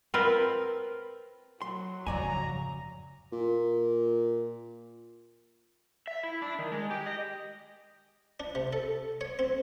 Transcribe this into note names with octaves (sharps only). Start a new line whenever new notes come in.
C4 F4 A#4 B4
F#3 C6
F2 G#2 C#3 D5 G#5 A#5
A#2
E5
E4
D4
D#3
G#3
G4
D#5
D4
C3
A4
C#5
C4